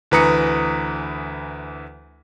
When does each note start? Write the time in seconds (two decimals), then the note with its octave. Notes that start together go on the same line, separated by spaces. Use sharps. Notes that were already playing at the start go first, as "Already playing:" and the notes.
0.11 D2 E3 B4 A#5 D#6 C#7